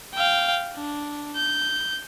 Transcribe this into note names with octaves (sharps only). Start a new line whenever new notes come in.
F5 G5
D4
G6